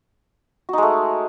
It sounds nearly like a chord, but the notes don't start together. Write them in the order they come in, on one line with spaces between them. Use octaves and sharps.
F#4 D#4 G#3 A3